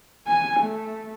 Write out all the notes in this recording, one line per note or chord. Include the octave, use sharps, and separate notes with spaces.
G#5
A3